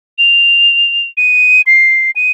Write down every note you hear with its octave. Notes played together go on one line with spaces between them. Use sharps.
F7
D#7
C7
D#7